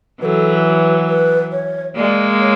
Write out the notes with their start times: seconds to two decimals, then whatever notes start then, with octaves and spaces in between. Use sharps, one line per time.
0.21 E3 F#3 B4
0.25 A4
0.65 B4
1.09 B4
1.52 C#5
1.96 G#3 A#3 D5
2.40 C#5